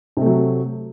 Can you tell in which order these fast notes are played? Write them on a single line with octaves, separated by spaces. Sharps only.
C3 A3 F#3